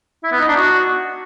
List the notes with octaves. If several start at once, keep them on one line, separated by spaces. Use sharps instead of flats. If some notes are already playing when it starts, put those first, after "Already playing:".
E4
B3
D#4
D4
F#4